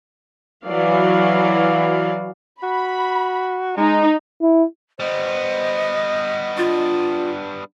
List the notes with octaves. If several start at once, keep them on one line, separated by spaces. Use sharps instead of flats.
E3 F#3 F#4 D5 F5
F#4 B5
G#3 D#4
E4
G3 B3 C5 D#5
D4 F4